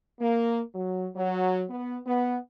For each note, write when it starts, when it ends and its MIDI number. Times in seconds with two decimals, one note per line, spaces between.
0.20 0.59 58
0.73 1.06 54
1.15 1.63 54
1.70 1.97 59
2.05 2.36 59